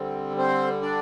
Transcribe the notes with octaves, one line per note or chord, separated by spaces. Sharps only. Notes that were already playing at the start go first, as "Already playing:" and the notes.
Already playing: D3 G3 C4
C4 C5
D4 D5